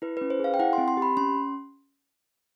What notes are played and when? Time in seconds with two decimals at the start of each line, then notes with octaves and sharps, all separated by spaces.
0.02 E4 B4
0.17 C#4 B4
0.30 C5
0.40 G#4 F5
0.54 G5
0.59 E4 F#5
0.73 C4 C6
0.88 C6
0.97 G4
1.02 B5
1.17 C#4 C6